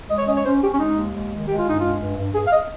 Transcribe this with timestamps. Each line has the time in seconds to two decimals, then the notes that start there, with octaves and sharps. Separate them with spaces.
0.10 G#3 D#5
0.19 C#5
0.27 C#4 D#5
0.37 C#5
0.45 C#4 C5
0.63 C#4 G4
0.74 C#4
0.80 G#3 D#4
0.97 D#2
1.14 G#3
1.31 D#3
1.48 G#3 G4
1.58 F4
1.65 G2 D#4
1.80 G#3 F4
2.00 G2
2.17 G2
2.34 G2 G#4
2.47 F5
2.53 D#5